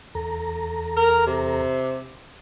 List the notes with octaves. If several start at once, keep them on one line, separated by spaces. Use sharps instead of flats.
E2 A4 A#5
A#4
C3